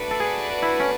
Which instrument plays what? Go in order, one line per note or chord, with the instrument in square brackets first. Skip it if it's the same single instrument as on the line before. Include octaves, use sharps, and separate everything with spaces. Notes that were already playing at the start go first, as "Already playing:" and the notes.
Already playing: [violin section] A3 D4 F#4 B4 D5
[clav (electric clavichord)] A4
G#4
E4
C#4